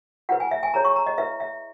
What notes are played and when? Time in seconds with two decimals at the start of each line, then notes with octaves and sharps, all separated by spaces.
0.29 E4 B4 F#5
0.40 G#5
0.51 E5
0.63 G#5
0.73 E4 G#4 C#5 A#5
0.85 C#6
0.96 A#5
1.06 D#5
1.18 E4 B4 E5
1.40 E5